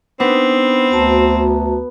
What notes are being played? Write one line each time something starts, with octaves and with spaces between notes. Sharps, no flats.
B3 C4 D4 D#4 B4
D2 F#4 A5 A#5